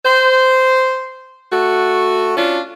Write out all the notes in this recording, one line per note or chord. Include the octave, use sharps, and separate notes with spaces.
C5
A3 F#4
C#4 D4 F4